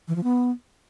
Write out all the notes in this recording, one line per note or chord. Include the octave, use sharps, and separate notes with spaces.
E3
F3
B3